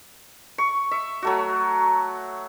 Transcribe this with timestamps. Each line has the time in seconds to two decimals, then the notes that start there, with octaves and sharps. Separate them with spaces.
0.58 C#6
0.91 E5
1.22 F#3 A3 F#4